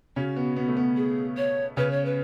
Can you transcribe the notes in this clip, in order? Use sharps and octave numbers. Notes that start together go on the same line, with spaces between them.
C#3 C#4 F#4
B2 B3
B2 B3
A3
B2 B3
G#4
C#5
C#3 C#4 B4
C#5
B4